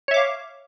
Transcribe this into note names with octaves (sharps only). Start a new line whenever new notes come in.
C#5 E5 F5 D6